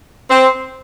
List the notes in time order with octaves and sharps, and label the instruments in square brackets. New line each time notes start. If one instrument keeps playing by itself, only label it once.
[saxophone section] C4